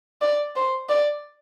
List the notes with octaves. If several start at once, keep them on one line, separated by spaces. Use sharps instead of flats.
D5
C5
D5